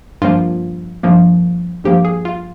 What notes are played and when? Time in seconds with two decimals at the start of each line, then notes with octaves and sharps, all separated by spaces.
0.22 G2 F3 A#3 F4
1.03 G2 F3 A#3
1.84 G2 F3 A#3 G4
2.05 G#4
2.25 F4